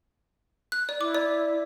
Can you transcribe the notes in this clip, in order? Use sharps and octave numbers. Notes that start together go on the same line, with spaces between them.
F#6
D5
E4 D6
D5